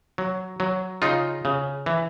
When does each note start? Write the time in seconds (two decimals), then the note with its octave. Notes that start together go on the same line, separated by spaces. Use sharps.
0.18 F#3
0.60 F#3
1.02 C#3 D#4 F4
1.45 C#3
1.86 E3